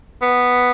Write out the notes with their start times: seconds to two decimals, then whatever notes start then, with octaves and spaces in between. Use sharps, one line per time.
0.22 B3